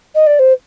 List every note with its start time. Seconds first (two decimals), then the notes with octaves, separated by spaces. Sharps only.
0.15 D#5
0.27 D5
0.39 C5